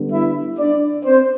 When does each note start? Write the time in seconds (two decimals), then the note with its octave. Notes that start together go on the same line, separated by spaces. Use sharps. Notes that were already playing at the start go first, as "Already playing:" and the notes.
Already playing: D3 G3 B3
0.12 E4 E5
0.58 D4 D5
1.05 C4 C5